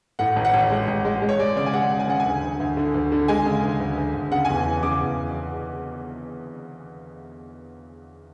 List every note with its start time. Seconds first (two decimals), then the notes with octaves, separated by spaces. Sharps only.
0.19 A2 F#5
0.36 A1
0.45 F#5
0.54 A1
0.70 G#3
0.88 A1
1.05 G#3
1.22 G#3
1.29 C#5
1.39 G#3 D5
1.56 C#3 D5
1.66 G#5
1.74 G#3 F#5
1.91 C#3
1.99 G#5
2.08 C#3 F#5
2.20 G#5
2.25 D2
2.43 D2
2.60 D2
2.77 D3
2.94 D2
3.12 D3
3.28 G#3 G#5
3.46 C#3
3.63 D2
3.80 D2
3.98 D2
4.14 D2
4.32 C#3 F#5
4.45 G#5
4.49 E2
4.57 G#5
4.66 E3
4.83 C#3 D6
5.00 E2